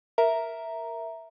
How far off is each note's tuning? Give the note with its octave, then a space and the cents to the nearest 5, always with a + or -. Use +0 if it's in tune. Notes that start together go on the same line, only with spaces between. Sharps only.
A#4 +0 E5 +0 A#5 +0